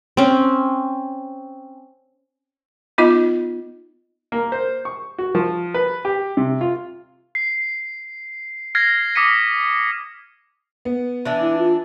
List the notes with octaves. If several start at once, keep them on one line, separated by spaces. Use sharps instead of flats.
C4 C#4
B3 D#4 F4 D#5
A#3
C5
C#6
F#4
F3
B4
G4
C3
F4
C7
F6 G#6 A#6 C7
D6 D#6 F6 B6 C#7 D#7
B3
E3 D4
E4
F4